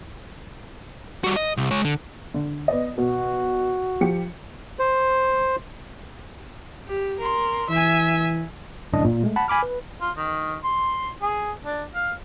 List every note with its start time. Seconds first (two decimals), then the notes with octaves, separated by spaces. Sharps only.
1.24 G3 F#4
1.36 D#5
1.57 C2
1.71 G#3 C#5
1.85 D3
2.34 D3
2.68 B3 D5 D#5
2.98 B2 F#4
4.01 F3 G4 C#7
4.79 C5
6.87 G4
7.19 A#4 C6
7.69 E3 E5 G#5
8.93 G1 C2 F#2 A2 D4 D#5
9.04 A#2
9.23 G#3 A3
9.36 F#5 A5 B5
9.48 G#5 B5 D6 F6
9.63 B4
10.01 F4
10.16 D#3
10.64 C6
11.22 G#4
11.64 D4
11.94 F5